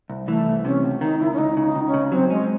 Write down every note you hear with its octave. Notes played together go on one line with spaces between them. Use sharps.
C2
E3 A3
C2
C3 C#4
C#2
D#3 D#4
C#2 E4
C#4
C#2 D#4
C#3
D#4
C#2
C#4
C#3
F#3 C4
G#3 C#4